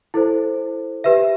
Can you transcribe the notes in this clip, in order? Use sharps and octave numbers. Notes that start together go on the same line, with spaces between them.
E4 A4 C5
G4 B4 E5